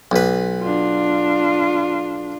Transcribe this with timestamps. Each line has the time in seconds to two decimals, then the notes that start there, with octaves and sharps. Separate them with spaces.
0.11 B1 B4
0.61 D4 F4